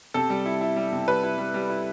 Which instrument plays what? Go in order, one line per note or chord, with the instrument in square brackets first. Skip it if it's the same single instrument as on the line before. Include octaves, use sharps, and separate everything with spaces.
[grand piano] C3 A4
G3
E4
E4
G3
C3
G3 B4
E4
G3
G3
E4